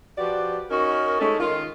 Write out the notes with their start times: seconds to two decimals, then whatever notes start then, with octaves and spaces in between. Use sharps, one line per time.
0.17 F3 F#4 G4 B4 D5
0.70 C#4 D#4 F#4 A#4
1.19 G#3 A3 C#4 D#4 A4
1.39 D#3 F4